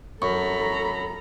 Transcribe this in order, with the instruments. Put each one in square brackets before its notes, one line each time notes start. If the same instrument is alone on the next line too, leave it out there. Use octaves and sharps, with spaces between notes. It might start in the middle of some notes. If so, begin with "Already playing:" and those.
[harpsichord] F#2 [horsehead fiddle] A4 A#5 [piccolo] B5 [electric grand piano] C#6